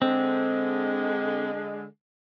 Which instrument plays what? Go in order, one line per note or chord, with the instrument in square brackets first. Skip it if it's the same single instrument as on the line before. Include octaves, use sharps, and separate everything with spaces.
[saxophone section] D3 G#3 [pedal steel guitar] C4